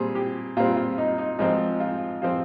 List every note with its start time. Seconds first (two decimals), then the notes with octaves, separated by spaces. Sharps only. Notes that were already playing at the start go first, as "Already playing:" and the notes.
Already playing: A#2 G3 C4 G#4
0.15 G4
0.57 A#2 G3 C4 F4
0.77 F4
0.98 D#4
1.18 D#4
1.39 G#2 F3 C4 D#4
1.80 F4
2.22 F3 C4 F4